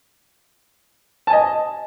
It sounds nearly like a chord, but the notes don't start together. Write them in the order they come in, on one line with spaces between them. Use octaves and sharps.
A5 G#5 D#5